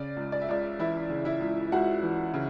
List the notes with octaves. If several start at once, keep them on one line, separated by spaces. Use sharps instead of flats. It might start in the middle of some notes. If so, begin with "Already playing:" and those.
Already playing: C#3 D5
C#2
D5
E5
C#2 D5
E3 E4 E5
C#3
E4 E5
C#2
C#2 F#4 F#5
E3
C#3